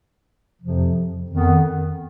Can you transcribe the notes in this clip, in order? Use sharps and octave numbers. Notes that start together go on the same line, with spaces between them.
F2 C3 F3
F2 D#3 B3